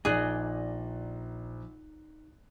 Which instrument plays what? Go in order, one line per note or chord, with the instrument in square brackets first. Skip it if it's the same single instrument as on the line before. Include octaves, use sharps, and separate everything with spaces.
[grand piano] A#1 F#6 [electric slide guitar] D#4 D5 D#5 [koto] G#4